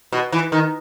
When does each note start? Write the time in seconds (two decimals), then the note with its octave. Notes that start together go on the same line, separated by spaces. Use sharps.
0.12 B2
0.32 E3
0.52 D#3